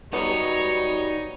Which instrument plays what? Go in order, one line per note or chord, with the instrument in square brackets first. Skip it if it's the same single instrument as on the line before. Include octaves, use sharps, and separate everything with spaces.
[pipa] F#3 B3 [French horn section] G3 F#4 [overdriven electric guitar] D#4 [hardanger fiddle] C#5